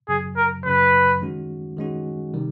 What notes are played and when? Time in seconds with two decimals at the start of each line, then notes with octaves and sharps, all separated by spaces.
0.08 F#2 C#3 F#3 G#4
0.36 A#4
0.65 F#2 C#3 F#3 B4
1.21 D#3 G#3 C#4 F#4
1.77 D#3 G#3 C#4 F#4
2.33 C3 D#3 G3